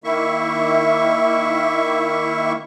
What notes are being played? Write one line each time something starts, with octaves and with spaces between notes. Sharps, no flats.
D#3 A#3 E4 E5 C#6